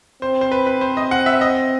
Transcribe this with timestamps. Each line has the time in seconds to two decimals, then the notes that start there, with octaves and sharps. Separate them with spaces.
0.22 C4 C5
0.41 C5
0.52 B4
0.67 B4
0.81 C5
0.97 D#5
1.11 F#5
1.26 E5
1.41 D#5